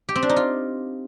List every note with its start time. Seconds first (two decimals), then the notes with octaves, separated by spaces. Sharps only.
0.09 G4
0.16 C4
0.22 D4
0.29 D#4
0.36 F4